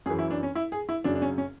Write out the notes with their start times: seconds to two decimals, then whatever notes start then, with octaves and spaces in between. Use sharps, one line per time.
0.06 F#2 G#4
0.10 E3
0.19 E4
0.31 D4
0.43 C#4
0.55 E4
0.72 G#4
0.89 E4
1.04 F#2 C#3 F#3 D4
1.16 D4
1.22 C#4
1.38 C#4